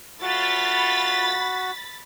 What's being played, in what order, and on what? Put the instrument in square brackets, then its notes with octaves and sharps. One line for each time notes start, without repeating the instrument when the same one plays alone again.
[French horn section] F#3 A3 F4 [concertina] F#4 [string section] B5 A6 B6